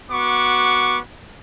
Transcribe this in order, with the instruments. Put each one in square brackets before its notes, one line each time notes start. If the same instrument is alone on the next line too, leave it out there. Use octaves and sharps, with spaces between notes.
[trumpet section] B3 F#4 C#6 D6